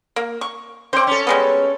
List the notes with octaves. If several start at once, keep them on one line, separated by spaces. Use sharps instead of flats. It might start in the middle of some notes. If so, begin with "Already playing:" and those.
A#3
C#6
C4 C5 D5
C#4 A4
G3 G#3 B3